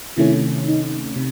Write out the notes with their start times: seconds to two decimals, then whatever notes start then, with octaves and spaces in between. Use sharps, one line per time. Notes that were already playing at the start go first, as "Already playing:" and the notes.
0.17 C3 D#3 A3 C#4 E4
0.67 D#4
1.16 C3